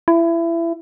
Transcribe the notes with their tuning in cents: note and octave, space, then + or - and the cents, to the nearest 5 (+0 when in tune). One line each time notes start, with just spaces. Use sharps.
E4 +25